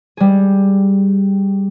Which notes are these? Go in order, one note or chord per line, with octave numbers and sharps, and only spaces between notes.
G3 G#4